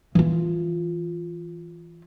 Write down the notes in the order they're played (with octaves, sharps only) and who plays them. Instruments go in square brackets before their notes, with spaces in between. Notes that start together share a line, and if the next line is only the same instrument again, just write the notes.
[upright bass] E3 F4